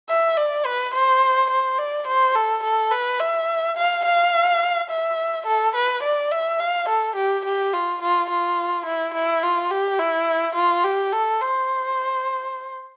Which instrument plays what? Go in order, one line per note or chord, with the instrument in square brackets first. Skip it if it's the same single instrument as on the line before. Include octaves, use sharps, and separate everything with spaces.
[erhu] E5
D5
B4
C5
C5
D5
C5
A4
A4
B4
E5
F5
F5
E5
A4
B4
D5
E5
F5
A4
G4
G4
F4
F4
F4
E4
E4
F4
G4
E4
F4
G4
A4
C5